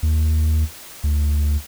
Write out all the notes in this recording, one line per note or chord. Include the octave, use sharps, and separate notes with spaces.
D#2
D2